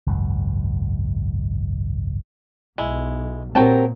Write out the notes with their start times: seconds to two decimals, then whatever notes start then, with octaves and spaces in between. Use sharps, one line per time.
0.07 G#1 C#2 F#2
2.78 B1 G#3 E4
3.55 A#2 F#3 C4 G4 A#4 G5 A5